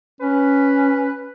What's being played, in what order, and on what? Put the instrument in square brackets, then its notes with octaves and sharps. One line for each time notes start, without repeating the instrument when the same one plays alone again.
[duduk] C#4 [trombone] B4